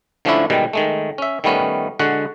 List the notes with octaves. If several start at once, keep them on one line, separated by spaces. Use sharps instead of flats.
D3 F3 A3 C#4 D4 E4
B2 D#3 G3 G#3
D#3 G#3 A3
C#4 E5
D#3 G3 A3 B3 C#4
D3 G#3 F#4 F#5